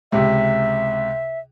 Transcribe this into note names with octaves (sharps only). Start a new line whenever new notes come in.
C#2 C3 E5